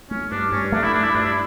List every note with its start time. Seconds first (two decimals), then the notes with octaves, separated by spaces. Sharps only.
0.11 A3 C#4
0.31 G2 D4
0.52 G2 C#4
0.72 A3 D4
0.83 E4
0.93 G2 D4
1.03 E4
1.15 G2 D4
1.25 E4